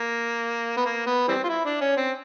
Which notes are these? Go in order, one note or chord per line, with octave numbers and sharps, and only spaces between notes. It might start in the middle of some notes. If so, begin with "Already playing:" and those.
Already playing: A#3
B3
A#3
B3
E3 G3 C4
F4
E4
D4
C#4
C4